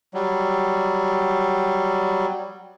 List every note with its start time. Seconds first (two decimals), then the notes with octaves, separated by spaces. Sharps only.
0.14 F#3 G3